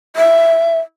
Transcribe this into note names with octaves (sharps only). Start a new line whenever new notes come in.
E5